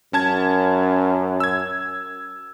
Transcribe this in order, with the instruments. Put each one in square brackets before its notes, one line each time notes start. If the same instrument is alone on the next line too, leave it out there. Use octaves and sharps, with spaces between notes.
[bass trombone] F#2 [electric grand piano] C#4 A5 G#6
[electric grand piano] E6 G#6